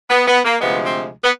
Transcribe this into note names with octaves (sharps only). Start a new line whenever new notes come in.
B3
B3
A#3
D2 C3 F3 G#3 B3
C4
B3